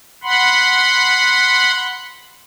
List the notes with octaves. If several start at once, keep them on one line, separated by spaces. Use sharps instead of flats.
F#5 B5 C6